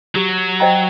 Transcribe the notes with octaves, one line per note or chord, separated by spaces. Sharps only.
F#3 G4
C5 D#5 G5 A#5